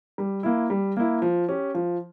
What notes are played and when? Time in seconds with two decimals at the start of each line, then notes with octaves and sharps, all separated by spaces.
0.18 G3
0.43 A#3 E4
0.70 G3
0.97 A#3 E4
1.22 F3
1.49 C#4 G4
1.74 F3